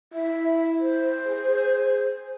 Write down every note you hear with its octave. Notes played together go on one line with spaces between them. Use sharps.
E4 E5
C5
G#4